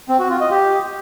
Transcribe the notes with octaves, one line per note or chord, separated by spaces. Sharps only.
C4
F#4
F4
D#5
G4